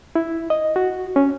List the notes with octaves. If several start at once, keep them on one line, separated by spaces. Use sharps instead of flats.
E4
D#5
F#4
C#4